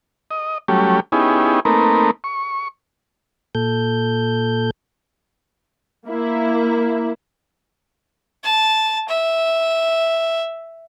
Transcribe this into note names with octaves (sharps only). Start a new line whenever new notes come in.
D#5
F#3 G3 A3 C#4 G4
B3 C#4 D#4 E4 G4 G#4
A3 A#3 C4 D#4 A#4 B4
C#6
A#2 A4 G6
A#3 E4
A5
E5